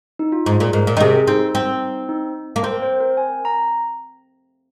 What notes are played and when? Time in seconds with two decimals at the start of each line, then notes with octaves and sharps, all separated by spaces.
0.19 D#4
0.32 F4
0.46 G#2 G#4
0.60 A#2
0.73 G#2 A#4
0.87 A#2
0.97 D#3
1.00 C3 G#4
1.27 C4 D#4
1.55 C4
2.09 D#4
2.56 A#3
2.63 C4 A#4
2.82 C5
3.00 A#4
3.17 G#5
3.45 A#5